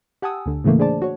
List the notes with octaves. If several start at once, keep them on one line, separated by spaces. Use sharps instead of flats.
G4 F#5 G#5 A5 D#6 E6
D2 D3
A2 C#3 E3 A3 A#3
D4 G#4 C5 D5 A5
F#4 C#5